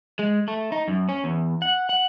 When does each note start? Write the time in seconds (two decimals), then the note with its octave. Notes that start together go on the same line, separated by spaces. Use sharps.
0.19 G#3
0.48 A3
0.72 D#4
0.88 F#2
1.09 C#4
1.24 E2
1.62 F#5
1.89 F#5